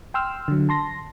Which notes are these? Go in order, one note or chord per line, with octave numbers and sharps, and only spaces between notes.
G5 C6 E6 F6
D3 F#3
A5 C6 A#6